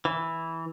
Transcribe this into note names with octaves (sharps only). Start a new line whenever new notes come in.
E3